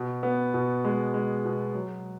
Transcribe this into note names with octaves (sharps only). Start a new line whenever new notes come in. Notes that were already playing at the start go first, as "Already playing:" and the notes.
Already playing: B2
B3
B2
G#3
G#3
B2
F#3